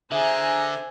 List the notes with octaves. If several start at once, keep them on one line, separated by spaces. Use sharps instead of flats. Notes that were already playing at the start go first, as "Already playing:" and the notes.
D3 G#4 C5 E5 G#5 A#5